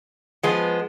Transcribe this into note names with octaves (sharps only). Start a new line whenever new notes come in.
F3 G#3 B3